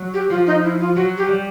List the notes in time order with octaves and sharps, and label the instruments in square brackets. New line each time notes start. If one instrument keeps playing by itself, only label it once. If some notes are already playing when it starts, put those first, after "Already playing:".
Already playing: [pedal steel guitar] F#3
[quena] G4
[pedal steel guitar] F3 [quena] F4
[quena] D#4
E4
F4
[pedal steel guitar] F#3 [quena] F#4
[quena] G4
[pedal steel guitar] G3